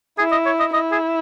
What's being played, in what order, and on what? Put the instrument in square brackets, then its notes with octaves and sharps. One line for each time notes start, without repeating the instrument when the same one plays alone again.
[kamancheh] E4 [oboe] G#4
[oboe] D#5
C#5
D#5
[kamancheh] E4 [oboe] D#5
[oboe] G#4